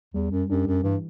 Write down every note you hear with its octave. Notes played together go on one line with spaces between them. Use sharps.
E2 G3
F#2
F#2 D4 G4
F#2
G2 E3